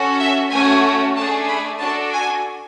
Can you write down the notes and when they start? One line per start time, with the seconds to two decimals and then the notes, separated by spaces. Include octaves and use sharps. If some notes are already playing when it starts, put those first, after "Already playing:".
Already playing: C#4 F#4 A4
0.20 E5
0.51 A3 C#4 F#4 G#5
1.16 A3 D4 G#4 A5
1.48 B5
1.79 D4 F#4 A4 A5
2.12 G#5